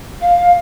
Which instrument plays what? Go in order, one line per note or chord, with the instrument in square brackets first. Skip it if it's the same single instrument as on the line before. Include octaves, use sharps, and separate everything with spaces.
[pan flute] F5